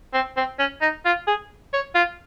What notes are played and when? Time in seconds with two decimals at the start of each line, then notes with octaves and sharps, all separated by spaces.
0.13 C4
0.37 C4
0.59 C#4
0.81 D#4
1.05 F4
1.27 G#4
1.73 C#5
1.95 F4